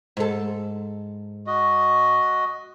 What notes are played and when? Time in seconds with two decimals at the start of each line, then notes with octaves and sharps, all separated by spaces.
0.17 G#2 A4
1.47 F#4 D#5